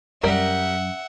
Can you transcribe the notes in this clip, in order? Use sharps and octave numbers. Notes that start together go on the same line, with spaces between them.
F#2 F#3 G3 A#4 E5 F#5